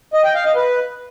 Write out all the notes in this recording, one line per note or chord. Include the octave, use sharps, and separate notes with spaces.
D#5
G5
F5
D#5
B4